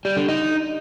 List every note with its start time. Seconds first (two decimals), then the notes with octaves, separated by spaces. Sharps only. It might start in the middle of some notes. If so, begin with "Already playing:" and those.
0.05 G3
0.17 D3
0.29 D#4